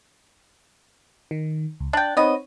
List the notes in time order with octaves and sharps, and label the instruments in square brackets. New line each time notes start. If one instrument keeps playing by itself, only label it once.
[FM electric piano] D#3
C#2
[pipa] D4 G5 [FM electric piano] F#6 A6
[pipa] B3 D#5 [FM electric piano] C4 D#4 C#5